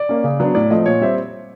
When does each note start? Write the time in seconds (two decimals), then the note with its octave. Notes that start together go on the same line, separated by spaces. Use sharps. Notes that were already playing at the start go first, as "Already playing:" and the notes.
Already playing: D5
0.09 A#3 C#4
0.24 C#3
0.40 F#3 B3 D4
0.55 A2 D5
0.70 F3 A3 C4 D#5
0.86 A#2 C#5
1.01 G3 C4 E5